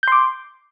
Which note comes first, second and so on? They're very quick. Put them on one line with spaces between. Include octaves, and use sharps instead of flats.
G6 C6 D6